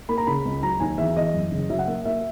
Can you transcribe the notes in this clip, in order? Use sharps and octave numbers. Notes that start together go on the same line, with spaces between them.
A#3 B5
A#5
C#3 B5
C#2
F#3 A#5
D#2 G#5
E2 E5
E2 D#5
F#2
C#3
F#3 E5
F#5
A#3 E5
A#3 E5